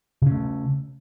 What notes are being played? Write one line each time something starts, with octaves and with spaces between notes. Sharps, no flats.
C#3 A3 C#4